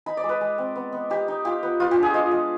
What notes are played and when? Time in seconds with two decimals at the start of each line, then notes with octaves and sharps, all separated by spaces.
0.06 D#4 B5
0.17 D5
0.24 G#3
0.29 B4
0.41 G#3
0.58 C4
0.76 B3
0.92 B3
1.10 D#4 G4
1.28 D#4
1.45 F4 G4
1.63 B3
1.80 B3 F4
1.91 G4
1.97 D4
2.03 G#4
2.14 F4 D#5
2.32 G#3